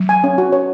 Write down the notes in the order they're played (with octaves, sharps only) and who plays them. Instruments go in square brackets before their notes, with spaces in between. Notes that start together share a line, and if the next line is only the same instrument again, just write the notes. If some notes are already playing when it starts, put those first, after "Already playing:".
Already playing: [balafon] F#3
[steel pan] G#5
C#4
F#4
C#5